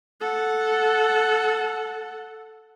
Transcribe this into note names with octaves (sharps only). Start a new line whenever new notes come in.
A4 F#5